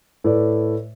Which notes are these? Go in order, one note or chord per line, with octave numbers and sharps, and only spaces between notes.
A2 A3 E4 B4 D5